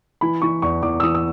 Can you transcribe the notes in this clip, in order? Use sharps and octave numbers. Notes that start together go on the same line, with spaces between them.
E3 B5
E3 C#6
E2 C#6
E2 D6
E6
E3 D#6
E6